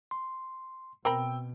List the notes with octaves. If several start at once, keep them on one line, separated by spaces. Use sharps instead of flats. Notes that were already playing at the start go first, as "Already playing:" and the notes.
C6
B2 C4 A#4 G5 B5 E6